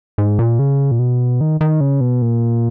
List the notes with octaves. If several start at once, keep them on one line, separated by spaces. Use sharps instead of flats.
G#2
A#2
C#3
A#2
B2
D#3
D#3
C#3
B2
A#2